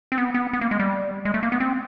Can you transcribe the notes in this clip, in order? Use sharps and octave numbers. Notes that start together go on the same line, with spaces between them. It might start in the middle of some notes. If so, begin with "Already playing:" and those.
C4
B3
B3
B3
A#3
G#3
G3
G#3
A3
A#3
B3
C4